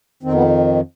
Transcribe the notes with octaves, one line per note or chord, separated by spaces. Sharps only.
F2 D#3 C4
B3